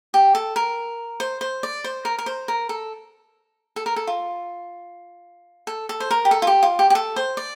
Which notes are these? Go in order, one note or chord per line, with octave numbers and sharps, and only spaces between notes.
G4
A4
A#4
C5
C5
D5
C5
A#4
A#4
C5
A#4
A4
A4
A#4
A4
F4
A4
A4
C5
A#4
G4
A4
F4
G4
F4
G4
G4
A4
C5
D5